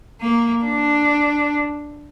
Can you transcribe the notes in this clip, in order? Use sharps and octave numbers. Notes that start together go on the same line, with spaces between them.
A#3
D4